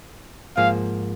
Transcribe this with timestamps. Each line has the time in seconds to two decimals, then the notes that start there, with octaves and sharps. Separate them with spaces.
0.57 G#2 F3 A#3 F5